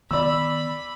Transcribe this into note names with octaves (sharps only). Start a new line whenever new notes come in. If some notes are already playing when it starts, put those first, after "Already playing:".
D#3 B3 D5 B5 E6